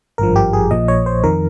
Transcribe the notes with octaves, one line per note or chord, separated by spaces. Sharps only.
G#1 G2 F3 A#4
G4
G#4
A#1 A#2 F3 D#5
C#5
C5
F2 D#3 A#4